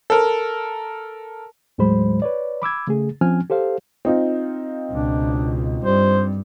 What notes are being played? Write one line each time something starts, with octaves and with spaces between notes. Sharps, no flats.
A4 A#4
D#2 A2 F#3 G#3 C5 B5
B4 C#5 D5
B5 D6 E6 G#6
C#3 A3 G#4
F3 C4 C#4 G#5 F6
G4 A4 C5 F5
C4 D#4 F4
C#2 B2 D4
G2 G3 C5